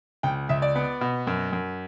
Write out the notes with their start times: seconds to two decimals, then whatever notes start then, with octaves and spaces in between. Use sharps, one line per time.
0.23 C#2 G5
0.49 C#2 E5
0.62 D5
0.76 B3
1.01 B2
1.27 F#2
1.53 F#2